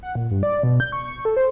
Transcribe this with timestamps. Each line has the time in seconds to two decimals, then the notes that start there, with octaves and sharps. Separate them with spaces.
0.03 F#5
0.15 A#2
0.31 G2
0.43 D5
0.63 B2
0.80 G6
0.92 C#6
1.08 C#6
1.25 A4
1.37 C5